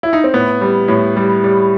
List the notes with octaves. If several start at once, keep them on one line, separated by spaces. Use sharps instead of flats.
E4
D#4
C4
A2 B3
G3
A2
G3
G3